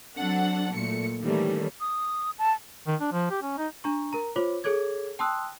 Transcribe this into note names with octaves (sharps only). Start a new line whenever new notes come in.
F#3 C4 D4 A4 F#5
A#2 F#3 A3 C#7
D#3 E3 G3 A3 A#3 C#4
D#6
A5
D#3
D4
F3
G4
C#4
D#4
D4 A#5 C#6
A#4 A#5
F4 C5 C#5 D6
G#4 A4 C#5 D6 G#6
G5 A5 C6 D#6 E6 F#6